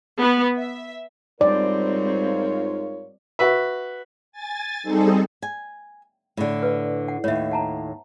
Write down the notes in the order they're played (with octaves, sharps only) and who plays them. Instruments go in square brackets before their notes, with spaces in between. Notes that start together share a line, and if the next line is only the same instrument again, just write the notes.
[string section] B3
E5
[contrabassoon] G#2 [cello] G3 C4 [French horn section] F4 A#4 C#5 [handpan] D5
[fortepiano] F#4 B4 E5
[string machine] G#5 A6
G3 C4 D#4 G#4 A4
[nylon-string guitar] G#5
A2 D3
[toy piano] B4 D5
F#5
[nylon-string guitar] D#2 A2 [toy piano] C#5 E5
[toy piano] F#5 A5 A#5